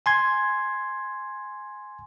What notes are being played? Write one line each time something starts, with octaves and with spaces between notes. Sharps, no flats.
G#5 C6 G#6